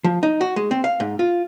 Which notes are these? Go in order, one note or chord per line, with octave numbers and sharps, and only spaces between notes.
F3
D#4
F#4
G#3
C4
F5
G#2
F4